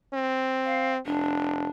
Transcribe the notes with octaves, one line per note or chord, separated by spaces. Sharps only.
C4
F5
F1 D4